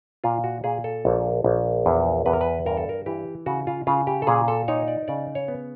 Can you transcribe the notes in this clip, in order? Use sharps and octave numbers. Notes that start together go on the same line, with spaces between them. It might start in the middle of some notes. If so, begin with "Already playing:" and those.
A#2 F4
F#4
A#2 G#4
A4
A#1
A#1
E2
E2 B4
A#4
B4
G2 A#4
A4
A#4
E3 G4
C#3 F#4
F4
C#3 F4
G4
A4
A#2 G#4
A4
D#4 C#5
D5
C#3 D5
C#5
B3